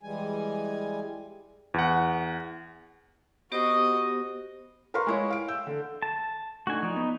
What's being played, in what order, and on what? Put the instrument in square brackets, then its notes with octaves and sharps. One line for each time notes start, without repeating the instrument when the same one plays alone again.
[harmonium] E3 G3 G#3 G#5
[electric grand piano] E2 F#5
[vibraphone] B3 G4 C5 [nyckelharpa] F#4 D#5
[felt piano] A#4 B4 F5 C6 C#6
G#3 E4 C#5
F5 D7
E6 G6
D3
[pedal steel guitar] A5
[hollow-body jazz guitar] A3 D4 D#4 [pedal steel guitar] F#4 G#5
[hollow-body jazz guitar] F3 D5 [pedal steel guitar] D#4
[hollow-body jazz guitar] B3